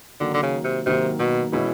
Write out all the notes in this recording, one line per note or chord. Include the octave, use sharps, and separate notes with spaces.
D3 D#3 F#3 A#3
D3
C#3
C3
C3 D#3 F#3 A#3
B2
B2 E3 G#3 C#4 E4